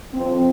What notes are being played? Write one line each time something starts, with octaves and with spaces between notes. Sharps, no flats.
F2 F3 C4